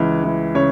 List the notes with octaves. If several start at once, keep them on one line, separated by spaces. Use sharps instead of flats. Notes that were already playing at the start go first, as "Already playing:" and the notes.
Already playing: C#2 E3
E3
C#3 C#5